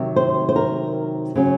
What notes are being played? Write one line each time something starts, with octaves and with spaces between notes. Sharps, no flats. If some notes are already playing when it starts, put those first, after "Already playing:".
Already playing: C3 D#3 F#3
C5
C5
A#4
C#3 F#3 C#4